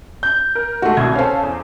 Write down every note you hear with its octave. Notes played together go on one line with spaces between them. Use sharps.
G6
A#4
G#2 A3 F#4 C6
C2 B2 F#4 G#6
C#4 A4 C5 F5
E2